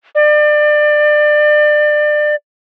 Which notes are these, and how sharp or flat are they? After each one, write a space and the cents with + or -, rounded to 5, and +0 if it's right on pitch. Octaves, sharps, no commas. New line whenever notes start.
D5 +30